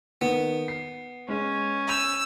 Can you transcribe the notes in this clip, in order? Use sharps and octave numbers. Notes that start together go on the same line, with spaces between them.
D#3 B3
C7
G#3 C#4
E6 G6 D#7 F7